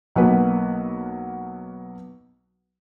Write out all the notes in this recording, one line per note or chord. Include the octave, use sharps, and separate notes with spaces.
B1 F#3 A#3 B3 B4